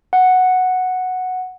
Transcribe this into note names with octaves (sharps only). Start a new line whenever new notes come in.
F#5